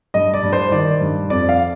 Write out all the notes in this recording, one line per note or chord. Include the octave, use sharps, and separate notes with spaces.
G2 D#5
D5
G2
C5
D#3 D5
G2
F2 D5
F5